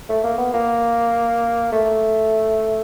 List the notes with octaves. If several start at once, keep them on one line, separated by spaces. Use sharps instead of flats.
A3
A#3
B3
A#3
A3